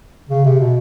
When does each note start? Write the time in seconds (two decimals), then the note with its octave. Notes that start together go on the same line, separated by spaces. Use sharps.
0.29 C#3
0.45 C3
0.60 B2